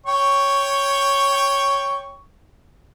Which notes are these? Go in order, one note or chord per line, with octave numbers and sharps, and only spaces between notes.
C#5 G5 C#6